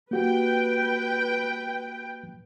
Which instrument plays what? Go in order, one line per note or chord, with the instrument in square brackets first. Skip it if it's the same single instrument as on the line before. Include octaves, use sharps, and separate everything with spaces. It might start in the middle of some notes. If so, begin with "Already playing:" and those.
[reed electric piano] A#3 F#4 G4 [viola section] B4 G5